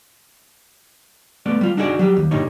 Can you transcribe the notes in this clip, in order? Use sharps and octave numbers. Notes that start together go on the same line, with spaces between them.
A3 B3 D5
G3 F4
D4 D#4 F#4 G#4 C#5 D5
F#3 G3 G4
D#2
G2 A#2 D3 G3 D#4 C#5